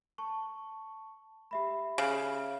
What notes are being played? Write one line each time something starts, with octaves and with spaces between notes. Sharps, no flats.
A5 C#6
G4 E5 B5
C#3